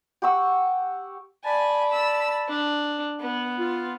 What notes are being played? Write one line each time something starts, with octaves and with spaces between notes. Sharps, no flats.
G4 F#5 C#6 E6
D5 G#5 A5 B5
E6
D4
B3
F4